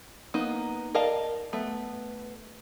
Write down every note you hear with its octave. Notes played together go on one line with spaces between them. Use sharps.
A#3 B3 D#4
A#4 D5 D#5 F5 A5
A3 B3